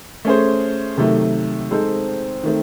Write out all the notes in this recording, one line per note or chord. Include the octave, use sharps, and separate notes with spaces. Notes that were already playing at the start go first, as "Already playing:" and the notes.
A3 C#4 G#4 C5
C3 D#3 F#3 A3
G#3 C4 D#4 A4 C5
D#3 A3 C4